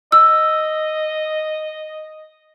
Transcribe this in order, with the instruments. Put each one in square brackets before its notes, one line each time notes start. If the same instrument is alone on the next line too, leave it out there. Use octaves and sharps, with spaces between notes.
[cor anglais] D#5 [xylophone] E6